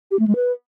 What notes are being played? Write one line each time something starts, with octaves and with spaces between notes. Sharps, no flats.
G4
A3
G#3
B4